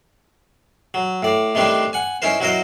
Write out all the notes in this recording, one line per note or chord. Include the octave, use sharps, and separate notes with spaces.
F#3
A2 D5
A2 D#3 G3 C4 D4 E4
F#5 G#5
C#4 D#4 E4 A#4 C5
F#3 E4 F#4 A#4 C5 D#5